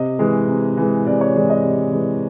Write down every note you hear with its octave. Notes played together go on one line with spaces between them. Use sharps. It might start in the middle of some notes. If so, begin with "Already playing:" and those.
Already playing: C3 D#5
E3 G#3
C3
E3 G#3
C3 D5
C#5
E3 G#3 D5
D#5
C3
E3 G#3